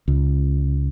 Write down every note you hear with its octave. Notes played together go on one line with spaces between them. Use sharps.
C#2